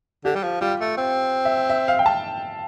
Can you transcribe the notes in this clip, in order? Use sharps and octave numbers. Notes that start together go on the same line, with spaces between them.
D3 G4
G3
F3
G3 F4
A3
C4
E5
E5
F5
G5
A5